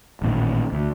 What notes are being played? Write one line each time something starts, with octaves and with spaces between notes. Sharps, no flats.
A1 G2 A#2 D#3
D2